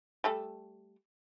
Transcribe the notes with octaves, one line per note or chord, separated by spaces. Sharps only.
G3 A3 A4